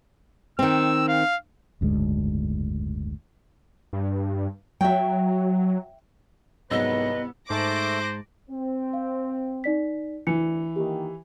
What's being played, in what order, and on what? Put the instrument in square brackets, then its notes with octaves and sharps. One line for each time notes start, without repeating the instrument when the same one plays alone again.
[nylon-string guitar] D#3 C4 [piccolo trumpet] E6
[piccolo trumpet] F5
[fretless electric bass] F#1 D2 G#2 G#3
[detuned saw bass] G2
[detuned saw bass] F#3 [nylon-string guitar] E5 G5
[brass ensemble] C2 B4 [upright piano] G#2 F#3 E6 [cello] B3 [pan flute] D#5
[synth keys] G#2 A5 [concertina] A3 A4 [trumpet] C5 [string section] D6 F#6 A#6
[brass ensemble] C4
[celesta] F5
D#4 D5 B6
[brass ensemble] D2 [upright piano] E3 [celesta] C#7
[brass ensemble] D#3 A#3 [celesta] G4